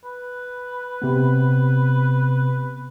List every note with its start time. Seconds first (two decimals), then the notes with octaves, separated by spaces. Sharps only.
0.05 B4
1.02 C3 B3